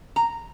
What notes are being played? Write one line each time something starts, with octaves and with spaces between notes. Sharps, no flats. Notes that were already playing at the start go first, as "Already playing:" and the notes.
A#5